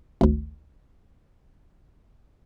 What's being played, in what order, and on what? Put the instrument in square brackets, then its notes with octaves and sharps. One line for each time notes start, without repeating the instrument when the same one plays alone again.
[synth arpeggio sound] G#1 D2